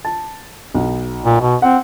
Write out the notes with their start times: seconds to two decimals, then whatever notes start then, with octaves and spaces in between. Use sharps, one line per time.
0.05 A5
0.74 B1
1.24 A#2
1.41 B2
1.62 C4 F#5